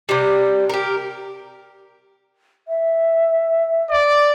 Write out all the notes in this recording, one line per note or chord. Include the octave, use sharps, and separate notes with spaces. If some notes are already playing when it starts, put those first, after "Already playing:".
C3 G3
G4 A#4
E5
D5